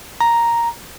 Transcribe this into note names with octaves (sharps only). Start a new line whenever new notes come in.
A#5